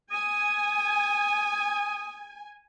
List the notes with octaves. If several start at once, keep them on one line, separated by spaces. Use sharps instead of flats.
G#5 D#6